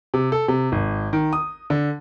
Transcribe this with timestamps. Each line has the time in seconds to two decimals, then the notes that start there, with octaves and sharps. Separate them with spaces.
0.14 C3
0.32 A4
0.48 C3
0.72 G#1
1.13 D#3
1.33 D#6
1.70 D3